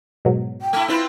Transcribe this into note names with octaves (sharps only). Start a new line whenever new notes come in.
G#2 B2 F#3
G5
A3 E4
C4 E4 F4 B4